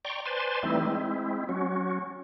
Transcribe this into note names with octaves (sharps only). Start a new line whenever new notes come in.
D5 G5 A#5 C6 C#6
B4 C5 D5 G#5 A5 C6
E3 G3 A3 C4 D#4 E4
G#3 C4 E4
F#3 C#4 F#4